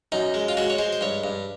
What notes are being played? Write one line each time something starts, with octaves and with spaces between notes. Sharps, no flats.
F#2 D#4
G#3
F4
G#3 F#4
C#5
G#3 C5
C5
G2 C#5
G2